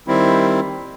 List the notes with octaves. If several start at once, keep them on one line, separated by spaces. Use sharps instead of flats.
D#3 G3 C4 E4